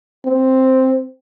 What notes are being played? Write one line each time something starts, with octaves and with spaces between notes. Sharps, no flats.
C4